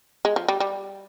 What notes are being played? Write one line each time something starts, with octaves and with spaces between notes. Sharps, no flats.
G#3
F3
G3
G3